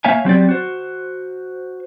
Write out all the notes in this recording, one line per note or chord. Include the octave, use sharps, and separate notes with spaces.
A#3 C#5 E5 F5 G#5
F#3 C4 G4 D5
F#4 C5